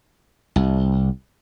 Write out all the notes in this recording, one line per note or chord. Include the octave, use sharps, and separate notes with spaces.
C2